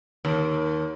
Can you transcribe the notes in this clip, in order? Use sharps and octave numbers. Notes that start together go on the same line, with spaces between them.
D#2